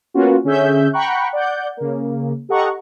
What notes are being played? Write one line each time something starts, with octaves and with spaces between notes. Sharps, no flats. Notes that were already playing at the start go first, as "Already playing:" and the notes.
A#3 B3 C#4 F4 F#4
D3 C#4 G#4 E5 G6
F#5 G5 A#5 B5 C#6 F#6
D5 F#5 G6
C#3 A#3
G4 A4 D#5 F#5 A#5 C#6